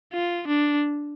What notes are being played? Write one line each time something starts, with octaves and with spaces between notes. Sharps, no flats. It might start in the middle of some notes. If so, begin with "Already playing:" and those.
F4
D4